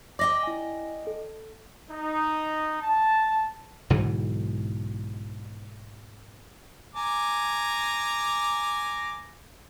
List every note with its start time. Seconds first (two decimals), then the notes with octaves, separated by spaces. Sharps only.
0.19 D5 D#5 G5 D6 A#6
0.43 E4 G#5
1.07 A4
1.89 D#4
2.81 A5
3.90 B1 G#2 D3 E3
6.96 G#5 A#5 D6